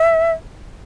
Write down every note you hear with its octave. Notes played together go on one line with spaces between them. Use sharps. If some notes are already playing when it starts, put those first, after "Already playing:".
Already playing: E5